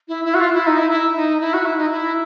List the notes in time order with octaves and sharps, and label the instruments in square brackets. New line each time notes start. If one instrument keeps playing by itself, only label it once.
[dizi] E4
E4
F#4
F4
E4
D#4
E4
E4
D#4
E4
F#4
E4
D#4
E4